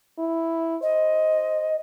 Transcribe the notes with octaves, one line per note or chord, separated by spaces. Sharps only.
E4
C5 D#5